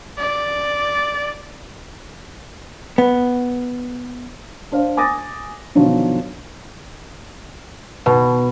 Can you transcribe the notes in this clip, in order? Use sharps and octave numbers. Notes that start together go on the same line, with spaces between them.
D5
B3
D4 C5 F5
G#5 D6 D#6 A6 A#6
B2 D3 D#3 F3 F#3 F4
B2